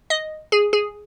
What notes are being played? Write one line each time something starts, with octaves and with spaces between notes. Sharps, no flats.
D#5
G#4
G#4